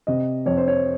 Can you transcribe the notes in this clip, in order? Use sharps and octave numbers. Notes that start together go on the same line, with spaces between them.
C3 D#5
F2 C#5
C5
C#5